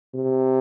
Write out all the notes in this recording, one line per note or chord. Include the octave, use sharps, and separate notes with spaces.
C3